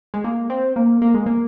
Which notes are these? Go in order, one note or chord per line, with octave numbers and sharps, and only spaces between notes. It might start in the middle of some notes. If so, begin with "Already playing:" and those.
G#3
A#3
C4
A#3
A#3
G#3
A#3